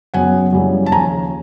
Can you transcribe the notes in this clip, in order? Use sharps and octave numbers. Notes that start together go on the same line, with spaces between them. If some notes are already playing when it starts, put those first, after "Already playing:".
F#2 C#3 F#3 B3 F#5 G#5
F#2 C#3 E3 G3 A#3
A5
D#2 C#3 F3 G#5 A#5